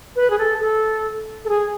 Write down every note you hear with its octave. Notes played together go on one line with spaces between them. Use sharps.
B4
G#4
A4
A4
A4
G#4